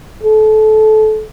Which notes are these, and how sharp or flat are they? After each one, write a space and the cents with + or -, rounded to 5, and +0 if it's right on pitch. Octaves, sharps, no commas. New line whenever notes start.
A4 -25